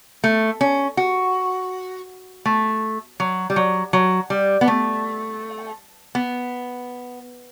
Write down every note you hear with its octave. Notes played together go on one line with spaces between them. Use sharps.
A3
C#4
F#4
A3
F#3
G3
F#3
F#3
G3
B3
A3
B3